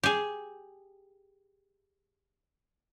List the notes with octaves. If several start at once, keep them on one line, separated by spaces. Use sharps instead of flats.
G4 G#4